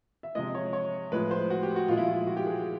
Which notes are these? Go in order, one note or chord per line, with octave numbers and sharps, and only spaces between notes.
E5
C3 F3 G#3 D#5
C#5
C#5
A2 F3 G#3 B4
C5
F#4
G4
F#4
A#2 F3 G#3 F4
E4
F4
F#4
G4
G#4